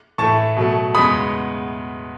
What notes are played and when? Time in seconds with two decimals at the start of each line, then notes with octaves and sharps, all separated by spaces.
0.18 A2 E3 A3 A5 C#6
0.57 B2 F#3 A3
0.94 E2 C#3 G#3 B3 B5 D#6